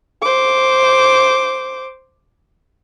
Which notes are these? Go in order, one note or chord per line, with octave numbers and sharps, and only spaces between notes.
C5 D6